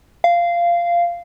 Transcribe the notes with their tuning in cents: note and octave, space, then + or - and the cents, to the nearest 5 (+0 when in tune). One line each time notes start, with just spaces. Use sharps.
F5 -15